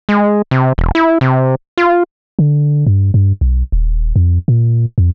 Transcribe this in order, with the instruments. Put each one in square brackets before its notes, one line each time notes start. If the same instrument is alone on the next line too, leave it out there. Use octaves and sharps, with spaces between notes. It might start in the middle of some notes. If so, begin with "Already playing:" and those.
[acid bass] G#3
C3
E1
E4
C3
F4
[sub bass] D3
G2
G2
B1
D#1
F2
A#2
F2